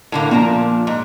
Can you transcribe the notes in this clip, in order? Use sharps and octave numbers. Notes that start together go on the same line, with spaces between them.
A2 D3 A#3
A#2 F3 D4 A#5
G#2